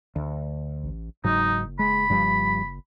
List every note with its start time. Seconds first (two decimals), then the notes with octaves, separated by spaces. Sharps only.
0.16 D2
0.83 A1
1.24 F#1 G#2 F#3 D#4
1.79 G#3 B5
2.10 G2 F3 G3